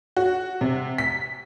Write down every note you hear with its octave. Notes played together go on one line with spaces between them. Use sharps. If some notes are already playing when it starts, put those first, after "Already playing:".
F#4
C3
B6